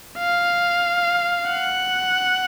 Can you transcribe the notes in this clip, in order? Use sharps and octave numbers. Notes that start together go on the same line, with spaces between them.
F5
F#5